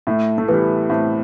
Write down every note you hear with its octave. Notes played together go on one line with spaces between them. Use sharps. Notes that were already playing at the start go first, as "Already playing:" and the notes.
A2 A3
A3
E3 G3 B3
A2 C4